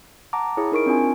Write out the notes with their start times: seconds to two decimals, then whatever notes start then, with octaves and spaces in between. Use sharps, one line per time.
0.33 F#5 A5 A#5 D6
0.57 E4 G#4 C#5
0.72 D#4 A#4 C#6 D7
0.86 C4 D4 F4 G#5